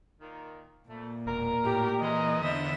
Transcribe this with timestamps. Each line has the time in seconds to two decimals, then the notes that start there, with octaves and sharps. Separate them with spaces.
0.20 A#2 D#3
0.88 F2 A#2 A3
1.26 E1 A#4
1.65 A2 G4
2.02 E3 G#3 A#4 B4 D#5
2.41 E2 D3 F3 B3 D#4 E5